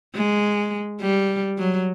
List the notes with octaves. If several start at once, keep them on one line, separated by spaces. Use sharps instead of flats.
G#3
G3
F#3